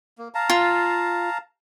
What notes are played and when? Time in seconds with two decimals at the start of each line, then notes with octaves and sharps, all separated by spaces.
0.18 A#3
0.34 F5 A5 A#5
0.50 F4